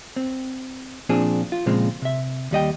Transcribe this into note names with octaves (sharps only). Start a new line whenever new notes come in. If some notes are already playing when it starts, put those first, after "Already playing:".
C4
A#2 F3 C4 D4 G#4
F4
A#2 C#3 F3 G#3 C4
C3 E5
D#2 G3 D#5 G5